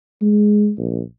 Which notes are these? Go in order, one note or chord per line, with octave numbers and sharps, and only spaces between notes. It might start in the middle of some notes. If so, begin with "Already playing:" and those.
G#3
A#1